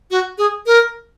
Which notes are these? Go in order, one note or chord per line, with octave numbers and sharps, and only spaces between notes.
F#4
G#4
A#4